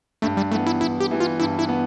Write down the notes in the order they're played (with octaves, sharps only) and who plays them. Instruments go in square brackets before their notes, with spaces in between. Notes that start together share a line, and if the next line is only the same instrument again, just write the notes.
[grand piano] G2 [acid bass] A3
[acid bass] G3
[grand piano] E3 B3 [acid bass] A3
[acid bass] E4
[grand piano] G2 [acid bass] E4
[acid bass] G4
[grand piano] E3 B3
[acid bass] F4
[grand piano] G2 [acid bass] E4
[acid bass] E4
[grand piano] B3